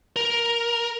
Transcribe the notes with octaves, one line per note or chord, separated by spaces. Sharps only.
A#4